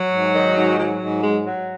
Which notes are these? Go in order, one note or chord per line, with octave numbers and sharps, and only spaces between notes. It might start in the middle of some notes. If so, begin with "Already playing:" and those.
Already playing: F#3
G#2
D#3
G#2
F#3
G#2
F#3 G#3
F#3